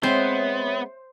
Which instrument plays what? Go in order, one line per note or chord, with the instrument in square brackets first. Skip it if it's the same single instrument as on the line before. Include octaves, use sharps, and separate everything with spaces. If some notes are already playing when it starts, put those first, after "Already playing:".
[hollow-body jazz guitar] G#3 C4 [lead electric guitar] B3 [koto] C5 [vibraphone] C#5 E5